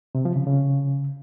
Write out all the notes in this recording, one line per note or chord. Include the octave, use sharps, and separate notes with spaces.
C3
F3
C#3
C#3